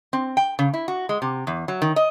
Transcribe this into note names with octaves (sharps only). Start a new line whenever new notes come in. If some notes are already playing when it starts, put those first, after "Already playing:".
C4
G5
C#3
E4
F#4
G#3
C3
E2
F#3
D#3
D#5